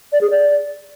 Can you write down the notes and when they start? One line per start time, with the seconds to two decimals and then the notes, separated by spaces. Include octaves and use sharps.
0.12 D5
0.21 G#4
0.30 D5